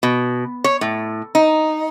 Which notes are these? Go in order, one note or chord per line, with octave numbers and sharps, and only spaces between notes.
B2
C#5
A2
D#4